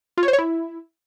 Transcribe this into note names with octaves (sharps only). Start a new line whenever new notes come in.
F4
C#5
C5
C#5
E4